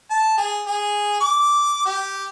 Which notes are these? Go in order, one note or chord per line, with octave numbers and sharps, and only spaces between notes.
A5
G#4
G#4
D6
G4